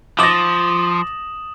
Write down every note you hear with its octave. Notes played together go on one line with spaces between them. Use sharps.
F3 D6 D#6 A6 A#6 E7 F#7